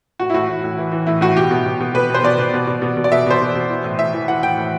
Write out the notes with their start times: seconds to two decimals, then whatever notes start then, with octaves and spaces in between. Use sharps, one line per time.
0.20 A2 F#4
0.30 E4
0.34 A2 F#4
0.49 A2
0.64 A2
0.78 E3
0.92 E3
1.07 A2 E4
1.21 A2 F#4
1.36 B2 G4
1.51 B2
1.66 B2
1.80 B2
1.94 B2 B4
2.10 B2 C5
2.24 B2 D5
2.38 B2
2.54 B2
2.67 B2
2.82 B2
2.97 B2
3.04 D5
3.11 B2 E5
3.26 B2 C5
3.41 B2
3.55 B2
3.70 E3
3.84 A2
3.99 A2 E5
4.13 E3
4.28 E3 F#5
4.43 A2 G5
4.58 A2